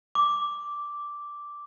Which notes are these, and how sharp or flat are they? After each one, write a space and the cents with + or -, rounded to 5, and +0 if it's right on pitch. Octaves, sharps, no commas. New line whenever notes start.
D6 -5